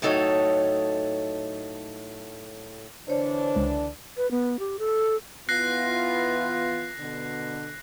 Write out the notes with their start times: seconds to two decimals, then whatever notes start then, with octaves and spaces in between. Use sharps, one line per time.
0.02 A2 F#3 D#4 A4 C#5 D#5
3.08 D3 E3 D4 C5 C#5
3.56 C#2
4.17 B4
4.31 B3
4.59 G4
4.79 A4
5.49 E3 B3 F4 F#6 A#6 C7
7.00 B2 D3